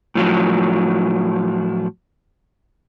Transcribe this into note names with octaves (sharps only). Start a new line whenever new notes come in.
A2 F3 F#3